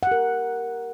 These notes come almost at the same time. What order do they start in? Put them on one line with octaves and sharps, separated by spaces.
F#5 G4 A#4